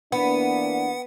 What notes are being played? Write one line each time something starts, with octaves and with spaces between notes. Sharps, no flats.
E3 A#3 B3 D4 F#5